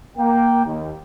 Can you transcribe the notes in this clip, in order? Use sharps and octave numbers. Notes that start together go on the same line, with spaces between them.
A#3 G5
D#2